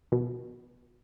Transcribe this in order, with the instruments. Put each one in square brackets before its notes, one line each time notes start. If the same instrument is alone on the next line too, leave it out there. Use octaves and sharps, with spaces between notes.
[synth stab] B2